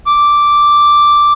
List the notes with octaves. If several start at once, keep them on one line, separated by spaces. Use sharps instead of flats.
D6